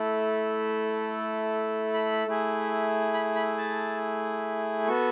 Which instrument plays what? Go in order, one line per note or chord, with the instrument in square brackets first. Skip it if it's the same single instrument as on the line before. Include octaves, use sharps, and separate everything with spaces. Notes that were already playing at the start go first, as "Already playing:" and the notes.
Already playing: [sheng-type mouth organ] A3 E4 A4
B5
A3 E4 G#4
B5
B5
A5
B3 F#4 A4 C#6